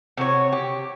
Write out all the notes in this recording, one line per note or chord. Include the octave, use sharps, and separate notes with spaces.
C3 F#4 G4 C#5
G4